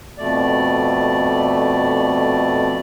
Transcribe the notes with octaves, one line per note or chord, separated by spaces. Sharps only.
F2 B2 A3 D5